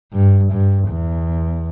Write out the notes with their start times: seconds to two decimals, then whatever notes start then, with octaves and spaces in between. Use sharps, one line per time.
0.14 G2
0.52 G2
0.90 E2